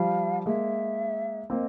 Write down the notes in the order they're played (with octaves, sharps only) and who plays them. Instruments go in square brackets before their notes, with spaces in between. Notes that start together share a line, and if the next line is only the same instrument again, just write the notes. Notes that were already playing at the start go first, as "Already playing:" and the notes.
Already playing: [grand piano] F3 G3 [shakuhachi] F5
[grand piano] G#3 A#3 [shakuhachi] E5
[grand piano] A#3 C4 [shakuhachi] D#5